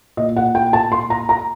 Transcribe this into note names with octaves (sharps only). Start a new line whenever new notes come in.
A#2 D#5
F#5
G5
A5
C6
A#5
A#5